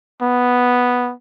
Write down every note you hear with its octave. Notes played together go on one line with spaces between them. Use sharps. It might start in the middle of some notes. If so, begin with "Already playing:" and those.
B3